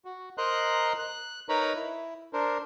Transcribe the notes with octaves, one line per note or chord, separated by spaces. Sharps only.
F#4
A#4 C5 D#5 A#5 C6 F#6
F#6
D#4 A#4 B4 C#5 A#5 B5
E4
D4 A#4 C5